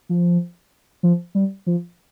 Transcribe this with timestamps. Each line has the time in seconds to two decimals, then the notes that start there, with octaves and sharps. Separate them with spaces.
0.09 F3
1.03 F3
1.35 G3
1.67 F3